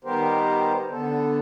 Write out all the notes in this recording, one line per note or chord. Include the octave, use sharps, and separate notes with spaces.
D#3 G3 B3 G4 A#4 C5
D3 B3 A4